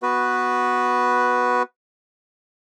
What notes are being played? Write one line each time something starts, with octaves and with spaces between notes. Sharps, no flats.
B3 F#4 B4